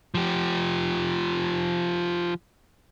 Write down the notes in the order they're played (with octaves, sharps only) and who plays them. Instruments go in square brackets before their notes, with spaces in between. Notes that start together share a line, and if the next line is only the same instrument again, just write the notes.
[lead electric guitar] F3 G4